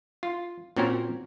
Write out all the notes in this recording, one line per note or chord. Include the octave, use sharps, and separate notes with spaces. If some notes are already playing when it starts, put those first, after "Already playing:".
F4
A#2 C4 C#4 F#4 A#4